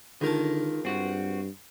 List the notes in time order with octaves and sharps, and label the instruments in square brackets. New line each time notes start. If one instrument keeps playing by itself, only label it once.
[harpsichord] C#2 A#4 A5 [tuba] D3 [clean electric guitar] D#3
[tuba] G2 [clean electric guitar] C4 F#4